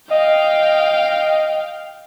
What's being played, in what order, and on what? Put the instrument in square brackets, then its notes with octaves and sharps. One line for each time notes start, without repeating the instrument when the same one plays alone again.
[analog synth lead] D#5 [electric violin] F5 G5